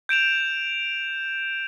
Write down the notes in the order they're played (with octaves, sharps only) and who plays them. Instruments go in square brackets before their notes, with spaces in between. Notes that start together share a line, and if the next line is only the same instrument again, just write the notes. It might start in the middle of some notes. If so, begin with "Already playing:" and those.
[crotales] G6 D7 E7 F7